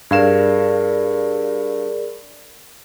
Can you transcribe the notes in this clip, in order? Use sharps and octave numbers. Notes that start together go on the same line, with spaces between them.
G2 G#4 A#4 D5 F5 E7